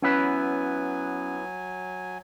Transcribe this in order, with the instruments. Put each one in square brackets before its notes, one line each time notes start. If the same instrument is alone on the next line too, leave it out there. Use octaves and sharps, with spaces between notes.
[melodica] F#3 G#5 [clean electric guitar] B3 E4 B4 [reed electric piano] C#4